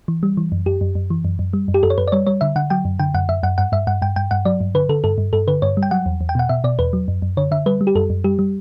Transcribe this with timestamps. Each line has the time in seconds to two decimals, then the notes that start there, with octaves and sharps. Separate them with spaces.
0.08 E3
0.23 G3
0.37 E3
0.52 F#2
0.66 F#2 G4
0.81 F#2
0.95 F#2
1.10 E3
1.25 F#2
1.39 F#2
1.53 G3
1.68 F#2
1.74 G4
1.83 F#2 A4
1.90 C#5
1.98 F#2 B4
2.08 D5
2.12 G3 C#5
2.27 G3 C#5
2.41 D3 E5
2.56 D3 F#5
2.70 F#3 G5
2.85 F#2
2.99 D3 G5
3.14 F#2 F#5
3.29 F#2 E5
3.43 F#2 F#5
3.58 G2 F#5
3.72 G2 E5
3.87 G2 F#5
4.02 G2 G5
4.16 G2 G5
4.31 G2 F#5
4.45 F#3 D5
4.61 G2
4.75 D3 B4
4.89 D3 A4
5.04 G2 A4
5.18 G2
5.33 G2 A4
5.48 D3 B4
5.62 G2 C#5
5.77 G3
5.83 G5
5.91 F#3 F#5
6.06 E2
6.21 E2
6.29 G5
6.35 B2 F#5
6.49 B2 E5
6.64 B2 D5
6.79 E2 B4
6.93 F#3
7.08 F#2
7.22 F#2
7.37 D3 C#5
7.51 D3 E5
7.66 G3 B4
7.81 G3
7.87 G4
7.95 F#2 A4
8.10 F#2
8.24 G3 G4
8.39 G3